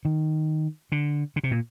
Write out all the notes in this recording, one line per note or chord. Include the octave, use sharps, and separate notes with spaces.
D#3
D3
D3
C3
A#2